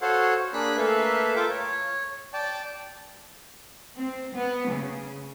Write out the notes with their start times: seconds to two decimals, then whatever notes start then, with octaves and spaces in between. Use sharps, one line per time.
0.01 F#4 A4 C5 C#5 F5 F#5
0.53 A#3 D4 G#4 B5 F#6
0.77 A3 A#3 A4 B4 E5 F5
1.36 F4 A4 A#4 G5 D6
1.50 C#5
2.34 D5 G5 A5
3.98 C4
4.34 B3
4.68 C#3